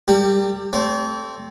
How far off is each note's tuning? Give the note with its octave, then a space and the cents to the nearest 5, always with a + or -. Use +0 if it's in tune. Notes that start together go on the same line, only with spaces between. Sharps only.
G3 +0 G4 +15 A#4 -40
A3 +0 C4 +0 D5 -40